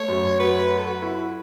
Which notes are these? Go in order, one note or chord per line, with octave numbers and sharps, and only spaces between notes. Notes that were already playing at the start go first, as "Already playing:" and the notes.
Already playing: A3 C#5
F#2
F#3 B4
F#3
A4
F#4
E4